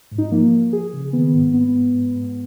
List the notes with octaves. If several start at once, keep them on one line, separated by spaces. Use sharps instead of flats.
G#2
D#4
F3 A#3
F3
F3 G#4
C#3
D#3 B3
G#2
G#2 B3
G#2
G#2
G#2